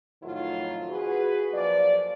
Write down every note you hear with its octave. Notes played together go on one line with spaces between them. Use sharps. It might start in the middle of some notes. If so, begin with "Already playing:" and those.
F2 A2 D#3 F#3 F4
F#4 G#4 B4
F#2 F3 A#3 D5